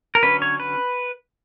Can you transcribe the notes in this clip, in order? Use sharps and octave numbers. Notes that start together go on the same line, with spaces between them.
A#4
D3 F#3 C#4 B4
C#5
B4